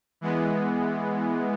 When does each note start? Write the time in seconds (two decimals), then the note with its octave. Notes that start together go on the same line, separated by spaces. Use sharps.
0.21 E3 G#3 B3